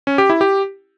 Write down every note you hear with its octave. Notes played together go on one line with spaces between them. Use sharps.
C#4
G4
E4
G4